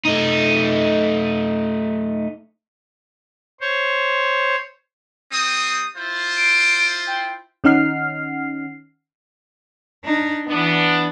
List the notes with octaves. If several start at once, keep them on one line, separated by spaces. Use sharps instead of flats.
A3 D#4
C5 C#5
G3 C4 D#6
E4 F4 C5
D7
G5
D#3 C#4 D#4 F#5 F6 C7
D4 D#4
E3 B3 D4